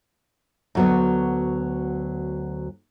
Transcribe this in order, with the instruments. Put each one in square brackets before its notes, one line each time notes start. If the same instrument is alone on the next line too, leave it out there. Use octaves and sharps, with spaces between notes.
[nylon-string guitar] D2 F#3 B3